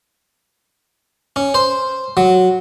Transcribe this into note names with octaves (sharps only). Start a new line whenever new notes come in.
C#4
C5
F#3